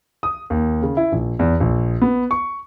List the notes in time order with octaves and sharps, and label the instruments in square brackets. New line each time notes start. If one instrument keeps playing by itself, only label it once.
[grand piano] D#6
D#2
C#3
E4
A#1
E2
A#1
B3
C#6